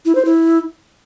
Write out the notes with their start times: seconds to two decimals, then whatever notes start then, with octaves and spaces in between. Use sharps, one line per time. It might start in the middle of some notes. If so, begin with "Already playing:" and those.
0.05 E4
0.15 C5
0.25 E4